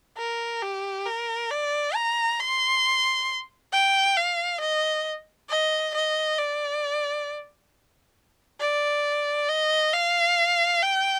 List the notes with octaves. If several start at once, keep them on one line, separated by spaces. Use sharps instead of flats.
A#4
G4
A#4
D5
A#5
C6
G5
F5
D#5
D#5
D#5
D5
D5
D#5
F5
G5